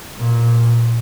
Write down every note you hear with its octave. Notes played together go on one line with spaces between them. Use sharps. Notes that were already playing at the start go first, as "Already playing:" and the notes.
A#2